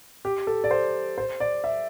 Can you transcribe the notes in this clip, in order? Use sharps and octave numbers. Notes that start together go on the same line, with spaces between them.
G4
A4
D5
C5
C5
D5
E5